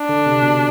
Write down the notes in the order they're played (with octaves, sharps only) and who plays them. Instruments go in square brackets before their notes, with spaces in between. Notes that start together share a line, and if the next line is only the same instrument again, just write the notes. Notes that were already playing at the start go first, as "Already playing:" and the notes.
Already playing: [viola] D4
[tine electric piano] D3
C3
B2